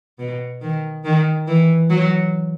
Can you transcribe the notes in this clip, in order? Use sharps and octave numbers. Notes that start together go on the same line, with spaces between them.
B2
D#3
D#3
E3
F#3